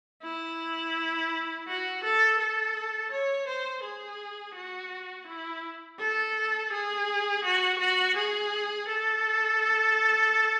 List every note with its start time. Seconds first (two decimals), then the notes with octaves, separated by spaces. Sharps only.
0.23 E4
1.67 F#4
2.04 A4
2.39 A4
3.11 C#5
3.47 C5
3.84 G#4
4.55 F#4
5.27 E4
5.99 A4
6.72 G#4
7.44 F#4
7.79 F#4
8.16 G#4
8.88 A4